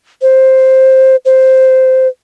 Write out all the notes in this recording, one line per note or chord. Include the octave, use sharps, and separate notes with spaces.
C5
C5